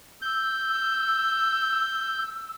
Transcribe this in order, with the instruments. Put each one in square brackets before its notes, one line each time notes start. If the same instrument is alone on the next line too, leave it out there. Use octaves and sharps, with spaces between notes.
[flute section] E6 [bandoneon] G6